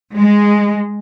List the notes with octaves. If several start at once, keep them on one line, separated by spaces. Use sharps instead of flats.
G#3